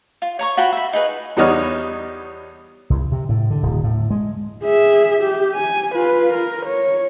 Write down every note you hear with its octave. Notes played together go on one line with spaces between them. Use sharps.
F4
C#5 A#5 C#6
F4 F#4 G5 B5
E5 B5
D#4 G#4 B4
E2 G3 B3 D#4 C#5 F6
C2
C3
A2
D3
D1
A2
G#3
G#4 E5
G4
G#5
F4 B4
A#4
C#5